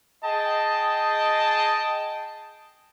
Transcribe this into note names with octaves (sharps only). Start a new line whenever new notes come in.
G#4 D#5 G5 A5